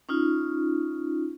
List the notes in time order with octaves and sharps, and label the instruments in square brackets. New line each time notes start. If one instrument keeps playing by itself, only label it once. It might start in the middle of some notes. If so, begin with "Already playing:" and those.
[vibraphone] C#4 D#4 F4